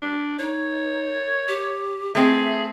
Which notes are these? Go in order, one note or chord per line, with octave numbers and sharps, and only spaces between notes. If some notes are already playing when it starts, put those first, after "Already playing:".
D4
D#4 C#5
G4
A3 C4 G#4 E5